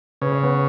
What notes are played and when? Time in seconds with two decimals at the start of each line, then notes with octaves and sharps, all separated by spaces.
0.21 C#3 B4
0.32 C#5
0.43 B3 B4